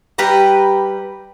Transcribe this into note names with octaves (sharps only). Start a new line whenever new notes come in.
G3 G4 B4 A#5